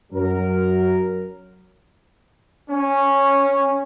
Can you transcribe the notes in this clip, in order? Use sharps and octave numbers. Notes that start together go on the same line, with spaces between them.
F#2 F#3 A#4
C#4